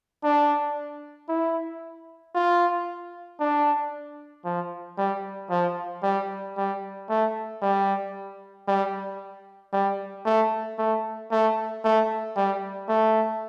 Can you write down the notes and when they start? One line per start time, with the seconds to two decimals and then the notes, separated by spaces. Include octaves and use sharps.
0.24 D4
1.29 E4
2.35 F4
3.40 D4
4.45 F3
4.97 G3
5.50 F3
6.03 G3
6.57 G3
7.09 A3
7.62 G3
8.68 G3
9.73 G3
10.25 A3
10.78 A3
11.31 A3
11.84 A3
12.36 G3
12.89 A3